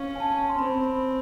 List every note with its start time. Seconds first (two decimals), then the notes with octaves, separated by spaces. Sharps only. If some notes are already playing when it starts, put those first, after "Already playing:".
Already playing: C#4 F5
0.15 G#5
0.20 A5
0.49 C6
0.58 C4 B5
0.83 B5